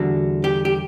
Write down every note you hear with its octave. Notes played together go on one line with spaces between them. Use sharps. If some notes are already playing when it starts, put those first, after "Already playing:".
Already playing: E2 D3 G3 F#4
G4
G4